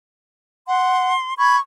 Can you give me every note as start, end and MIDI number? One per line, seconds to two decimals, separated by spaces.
0.68 1.14 78
0.68 1.32 84
1.38 1.57 83
1.38 1.60 85
1.38 1.57 92